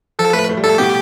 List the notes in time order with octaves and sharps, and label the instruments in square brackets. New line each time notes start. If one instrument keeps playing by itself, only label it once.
[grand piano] F3 [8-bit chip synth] A4
[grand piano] A2 A3 [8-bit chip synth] B4
[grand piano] A2 A3
G3
[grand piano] A2 A3 [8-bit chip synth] A4
[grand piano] B2 B3 [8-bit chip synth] G4